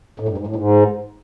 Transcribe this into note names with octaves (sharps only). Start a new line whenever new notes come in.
A2
G2
G#2
A2
G#2